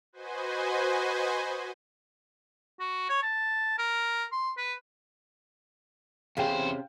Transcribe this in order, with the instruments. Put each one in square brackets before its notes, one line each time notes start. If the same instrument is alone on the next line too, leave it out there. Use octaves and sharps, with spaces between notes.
[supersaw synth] F#4 B4 C5 D#5 G#5
[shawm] F#4
C#5
A5
A#4
C6
B4
[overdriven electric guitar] E2 C5 [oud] C3 C#4 G#4 [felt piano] F5 G5